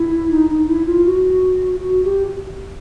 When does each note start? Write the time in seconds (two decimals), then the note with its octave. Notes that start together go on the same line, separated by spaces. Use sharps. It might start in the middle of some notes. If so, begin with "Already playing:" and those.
Already playing: E4
0.31 D#4
0.50 D#4
0.68 E4
0.86 F4
1.06 F#4
1.80 F#4
2.04 G4